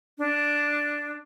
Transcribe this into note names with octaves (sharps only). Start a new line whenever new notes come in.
D4